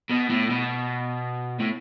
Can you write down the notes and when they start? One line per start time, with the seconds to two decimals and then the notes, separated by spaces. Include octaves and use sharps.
0.11 B2
0.30 A2
0.50 B2
1.60 A2